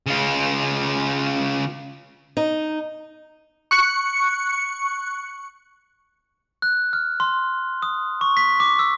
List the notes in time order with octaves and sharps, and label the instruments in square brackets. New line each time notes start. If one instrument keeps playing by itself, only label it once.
[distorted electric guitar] C#3 F4
[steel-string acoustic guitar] D#4
[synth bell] C#6 F#6 C#7
[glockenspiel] F#6
F6
C6
D#6
C#6
B6
D6
E6